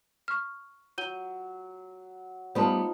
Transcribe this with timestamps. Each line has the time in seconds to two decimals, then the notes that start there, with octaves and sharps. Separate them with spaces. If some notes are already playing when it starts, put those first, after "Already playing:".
0.28 C#6 F6
0.98 F#3 G6 D#7 G7
2.55 G3 B3 D#4 F4 C5 A5